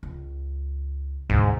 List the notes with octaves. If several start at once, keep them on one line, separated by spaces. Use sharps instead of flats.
C#2
D2 G#2 B2